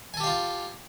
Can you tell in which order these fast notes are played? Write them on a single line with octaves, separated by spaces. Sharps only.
G#5 A4 G4 F5 F4